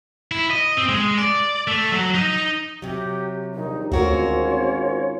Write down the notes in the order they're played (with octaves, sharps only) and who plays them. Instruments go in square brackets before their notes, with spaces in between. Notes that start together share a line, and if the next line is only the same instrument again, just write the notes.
[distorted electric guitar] E4
D#5
C4
G#3
D5
A3
F#3
D#4
[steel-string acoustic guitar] C3 F#3 [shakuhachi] G4
[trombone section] A#1 D#2 G3 [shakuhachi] D#4
[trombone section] G#1 C#4 F4 [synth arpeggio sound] D2 [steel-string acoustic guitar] C4 F#4 A#4 [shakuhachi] C#5